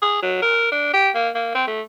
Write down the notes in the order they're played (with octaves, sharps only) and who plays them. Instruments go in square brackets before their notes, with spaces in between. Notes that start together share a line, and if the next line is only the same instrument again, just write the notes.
[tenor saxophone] G#4
F#3
A#4
D4
G4
A#3
A#3
C4
A3